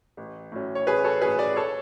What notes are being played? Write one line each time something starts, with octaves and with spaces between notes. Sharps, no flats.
A1
A2 F#3 C#4
C#5
A1 G#4 B4
A4 C#5
A2 F#3 C#4 G#4 B4
B4 D5
A4 C#5